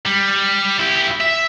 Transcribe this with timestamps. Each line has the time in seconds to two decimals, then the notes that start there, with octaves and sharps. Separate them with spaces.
0.06 G3
0.79 E4 G4
1.21 E5